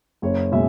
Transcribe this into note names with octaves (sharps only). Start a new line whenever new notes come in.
F#1 C#5
B2 G#3 E5